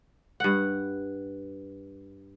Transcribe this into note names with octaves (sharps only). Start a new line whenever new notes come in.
G2 F#5